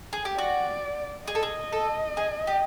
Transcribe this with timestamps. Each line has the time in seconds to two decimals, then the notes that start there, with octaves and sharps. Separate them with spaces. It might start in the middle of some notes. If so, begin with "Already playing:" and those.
0.13 G#4
0.25 G4
0.38 F#4 D5
1.27 G#4 D#5
1.35 A4
1.43 G#4
1.73 A4
2.17 G#4
2.47 G4